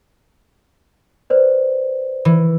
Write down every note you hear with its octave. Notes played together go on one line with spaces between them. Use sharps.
B4 C5 D5
E3